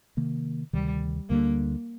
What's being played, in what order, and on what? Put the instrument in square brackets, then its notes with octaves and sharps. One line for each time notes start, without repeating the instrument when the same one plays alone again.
[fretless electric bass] C3 D#3 A#3
[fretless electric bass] D2 C3 D#3 [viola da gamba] G3
[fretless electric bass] D2 D3 G3 [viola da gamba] A#3